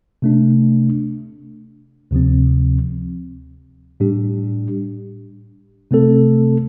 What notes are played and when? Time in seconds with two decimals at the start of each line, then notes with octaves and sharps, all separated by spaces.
0.22 C3 A3 D4
2.11 D2 C3 F3 C4
4.00 A2 G3 D4 G4
5.91 C3 A3 C4 A4